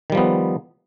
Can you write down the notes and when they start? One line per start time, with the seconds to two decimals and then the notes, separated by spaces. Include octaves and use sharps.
0.10 D#3
0.12 G3
0.15 F3
0.17 B3